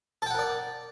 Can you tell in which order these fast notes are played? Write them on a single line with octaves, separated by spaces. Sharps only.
A4 G5 F#5 A#4 D5